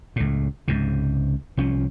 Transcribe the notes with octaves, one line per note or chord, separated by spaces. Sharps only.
C#2 A2
C#2 G#2 C3
C2 F3 C#4